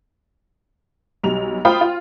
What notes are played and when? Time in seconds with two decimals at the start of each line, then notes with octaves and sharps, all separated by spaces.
1.24 B1 G3 F7
1.65 F4 C5 F5 G5 B5 D#6
1.81 F4